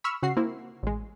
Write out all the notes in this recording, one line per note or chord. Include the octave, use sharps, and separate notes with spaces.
B5 C#6 E6 F6
C#3 F#4 F#5 C7
A#3 C4 E4
A1 G#3